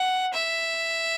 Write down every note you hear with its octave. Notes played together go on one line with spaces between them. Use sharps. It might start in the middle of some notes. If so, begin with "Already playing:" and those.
Already playing: F#5
E5